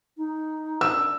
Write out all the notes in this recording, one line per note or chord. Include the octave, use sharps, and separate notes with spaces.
D#4
D4 E6